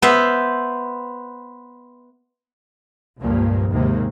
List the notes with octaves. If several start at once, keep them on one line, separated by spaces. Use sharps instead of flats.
B3 C5 E5
C#2 G2 A#2 F3 A#3
D#2 G#2 C3 D#3 G#3 A#3